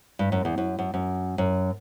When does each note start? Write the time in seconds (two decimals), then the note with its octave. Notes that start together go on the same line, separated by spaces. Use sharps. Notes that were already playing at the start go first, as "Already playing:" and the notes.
0.19 G2
0.32 F#2
0.45 E2
0.58 F#2
0.79 F#2
0.94 F#2
1.38 F#2